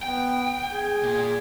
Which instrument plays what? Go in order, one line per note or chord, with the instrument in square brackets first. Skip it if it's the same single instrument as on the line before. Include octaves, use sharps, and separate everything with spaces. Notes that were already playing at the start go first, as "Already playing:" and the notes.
[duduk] B3 [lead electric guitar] G5
[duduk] G#4
[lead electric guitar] A#2